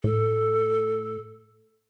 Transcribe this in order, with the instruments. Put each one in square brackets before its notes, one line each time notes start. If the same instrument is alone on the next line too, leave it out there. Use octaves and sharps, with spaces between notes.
[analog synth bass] A2 [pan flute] A4